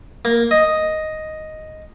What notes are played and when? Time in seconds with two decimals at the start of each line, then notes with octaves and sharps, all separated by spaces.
0.25 A#3
0.51 D#5